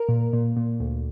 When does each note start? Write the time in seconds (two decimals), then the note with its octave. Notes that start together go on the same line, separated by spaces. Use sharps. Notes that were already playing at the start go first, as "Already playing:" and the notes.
Already playing: A#4
0.09 A#2
0.33 A#2
0.57 A#2
0.80 D2